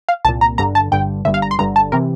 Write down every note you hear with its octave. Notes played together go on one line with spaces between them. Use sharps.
F5
C2 A#2 A5
A#5
G1 G2 D3 A#5
A5
G1 G2 D3 G5
G1 G2 D3 E5
F5
A#5
C6
G1 G2 D3 A#5
A5
C3 E3 A#4